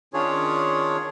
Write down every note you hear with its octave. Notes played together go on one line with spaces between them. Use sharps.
D#3 C#4 D4 F4 G#4 C#5